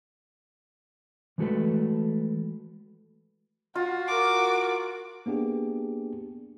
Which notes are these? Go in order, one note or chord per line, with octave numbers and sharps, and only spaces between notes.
E3 G#3 A3 F#4 A4 B4
F4 F#4
A#4 D6
A#3 B3 D4 G4 G#4